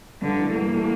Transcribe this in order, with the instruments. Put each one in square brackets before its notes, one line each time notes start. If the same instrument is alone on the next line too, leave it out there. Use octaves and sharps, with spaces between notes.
[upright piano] G2 [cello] D3
[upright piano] E3 A3
[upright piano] G2 [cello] A#3
[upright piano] E3 A3